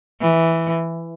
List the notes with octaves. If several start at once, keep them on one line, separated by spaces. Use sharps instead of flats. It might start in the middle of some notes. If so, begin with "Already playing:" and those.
E3